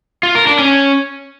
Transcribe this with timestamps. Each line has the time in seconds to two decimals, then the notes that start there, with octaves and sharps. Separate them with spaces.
0.23 F4
0.35 A#4
0.47 D4
0.59 C#4